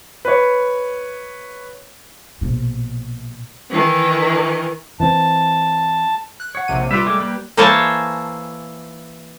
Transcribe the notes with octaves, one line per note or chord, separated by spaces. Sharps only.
B4 C#5
A#1 B2
D#3 E3
E3 C4 A5
F#6
C#5 F#5
A#1 C3 D#7
G3 F4 G4 B4 E5
G#3 A3 D6
A#3 B4
E3 A#3 C5 C#5 G#5 A5